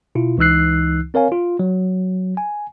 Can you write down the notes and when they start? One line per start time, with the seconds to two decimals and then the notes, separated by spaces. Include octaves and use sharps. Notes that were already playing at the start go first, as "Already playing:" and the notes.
0.15 B2 E4 F4
0.38 C#2 E3 D#4 E6 F#6 C7
1.14 C4 A#4 C#5 F5 G#5
1.32 F4
1.59 F#3
2.37 G#5